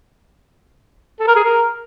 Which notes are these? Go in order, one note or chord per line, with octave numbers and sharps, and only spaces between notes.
A4
A#4
G#4
A#4